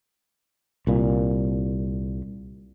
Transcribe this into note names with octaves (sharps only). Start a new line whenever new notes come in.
C2 A#2